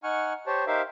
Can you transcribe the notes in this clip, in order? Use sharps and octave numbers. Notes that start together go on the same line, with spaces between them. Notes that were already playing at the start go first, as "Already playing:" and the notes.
D#4 F#5 G#5 C#6 F6
G4 C5 C#5 A5
D#4 G4 A#4 C5 E5 F5